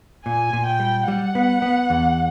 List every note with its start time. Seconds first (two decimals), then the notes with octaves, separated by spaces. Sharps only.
0.25 A#2 G#5
0.53 A#2
0.66 G5
0.80 G3
1.08 G3 F#5
1.35 B3
1.62 B3
1.90 E2